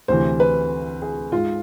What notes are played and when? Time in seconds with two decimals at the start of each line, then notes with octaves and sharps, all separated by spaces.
0.08 D2 C3 E3 C5
0.40 B4
1.02 G#4
1.32 G#2 G#3 F4